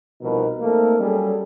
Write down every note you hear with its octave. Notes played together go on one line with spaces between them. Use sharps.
C2 B2 F3 D#4 A#4 B4
A3 A#3 C4 D#4 A4 A#4
F#3 G3 C#4 G#4 A4